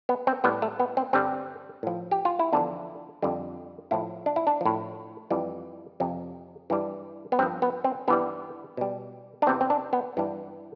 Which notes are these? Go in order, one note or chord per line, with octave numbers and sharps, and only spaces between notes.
B3
C4
A2 G3 B3
A3
B3
C4
G2 D3 G3 C4
A2 F3
G4
F4
E4
E2 D3 F3 D4
F2 D3 G3
A2 F3 E4
D4
E4
D4
A2 F3
F2 E3 G3
F2 C3 F3
G2 E3 G3
B3
G2 F3 C4
B3
C4
G2 E3 G3 B3
B2 G3
D4
E2 C3 E3 C4
C4
D4
B3
G2 E3 G3